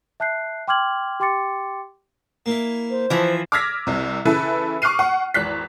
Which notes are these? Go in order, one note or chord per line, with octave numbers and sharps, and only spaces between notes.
E5 A5 F#6 G6 C7
G5 C6 D6 F6 G#6 F#7
G4 G5 C6 D6 A6 C#7
A#3 E4
C5
E3 F3 E5
D6 E6 F6 G#6 A#6 B6
C2 C3
C#3 E3 E4 A4 B4
C#6 D6 F6 F#6 C7 D#7
F#5 C#6
G#1 E2 F#6 B6